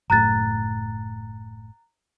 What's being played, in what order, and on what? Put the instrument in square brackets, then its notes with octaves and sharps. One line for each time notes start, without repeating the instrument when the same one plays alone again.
[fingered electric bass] F#1 A2 [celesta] A#5 F#6 A6